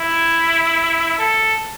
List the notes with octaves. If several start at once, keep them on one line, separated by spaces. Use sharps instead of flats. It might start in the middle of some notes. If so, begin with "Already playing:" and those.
Already playing: E4
A4